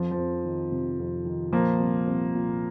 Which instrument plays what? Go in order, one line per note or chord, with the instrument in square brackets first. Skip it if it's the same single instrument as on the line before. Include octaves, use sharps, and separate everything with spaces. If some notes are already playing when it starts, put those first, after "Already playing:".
Already playing: [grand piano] F2 F3
F3
F2
D#3
C3
F2
D#3
A#2 F3 A#3
C2
C2
A#2